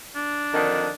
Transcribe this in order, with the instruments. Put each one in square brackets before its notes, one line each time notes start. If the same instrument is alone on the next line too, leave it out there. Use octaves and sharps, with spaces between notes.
[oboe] D4
[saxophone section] F2 D3 D#3